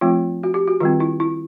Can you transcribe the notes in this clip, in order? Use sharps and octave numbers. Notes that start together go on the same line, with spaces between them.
F3 A3 C4 F4
F#4
G4
F#4
D#3 G3 C4 F4
E4
E4